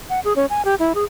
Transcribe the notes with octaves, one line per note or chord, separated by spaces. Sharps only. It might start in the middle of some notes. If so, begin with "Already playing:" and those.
F#5
G#4
C#4
G#5
G4
E4
G#4